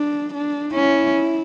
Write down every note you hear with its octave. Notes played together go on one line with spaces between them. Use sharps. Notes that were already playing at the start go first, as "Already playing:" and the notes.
Already playing: D4
D4
C#4 E4